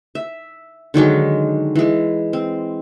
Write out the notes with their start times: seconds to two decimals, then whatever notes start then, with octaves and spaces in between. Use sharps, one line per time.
0.15 E5
0.94 D3 D#3 F#3 G#3
1.75 E3 G#3
2.33 C4